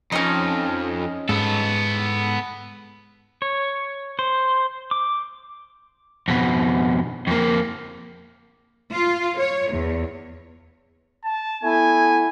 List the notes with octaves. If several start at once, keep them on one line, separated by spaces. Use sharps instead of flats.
F2 C#4 D#4
G#2 B3 A4
C#5
C5
D6
F2 B2
F2 A#3
F4
C#5
E2
A5
A3 B3 E4 G#5